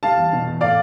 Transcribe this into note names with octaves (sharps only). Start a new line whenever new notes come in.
G3 F5 A5
E2
B2
E2
A2 D5 F5